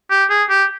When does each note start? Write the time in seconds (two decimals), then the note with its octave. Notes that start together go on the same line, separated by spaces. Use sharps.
0.10 G4
0.30 G#4
0.50 G4